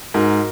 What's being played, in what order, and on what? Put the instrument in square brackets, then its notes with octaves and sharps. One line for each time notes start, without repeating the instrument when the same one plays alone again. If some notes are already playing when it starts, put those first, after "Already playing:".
[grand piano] G#2 [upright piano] F#4 A#4